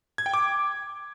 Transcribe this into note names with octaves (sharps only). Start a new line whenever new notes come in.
G#6
G5
D6